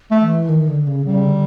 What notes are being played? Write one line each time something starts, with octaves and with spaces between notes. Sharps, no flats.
A3
E3
D#3
D3
C#3
C#3 G3
D3